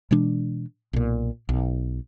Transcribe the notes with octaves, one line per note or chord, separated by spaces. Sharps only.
B2 E3 G#3 D4
B1 A#2
B1